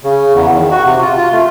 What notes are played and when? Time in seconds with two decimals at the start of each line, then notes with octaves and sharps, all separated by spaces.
0.04 C#3
0.34 E2
0.53 D#3
0.71 F#4
0.84 C3
1.02 F4
1.17 F4
1.32 A3